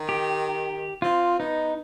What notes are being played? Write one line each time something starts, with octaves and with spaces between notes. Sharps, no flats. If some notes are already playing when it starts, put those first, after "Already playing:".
Already playing: D#3
G4
C4 F4
B3 D#4